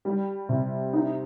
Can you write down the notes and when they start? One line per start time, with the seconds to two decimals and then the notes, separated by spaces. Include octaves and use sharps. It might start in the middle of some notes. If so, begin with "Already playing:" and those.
0.05 G3
0.49 C3
0.93 D#4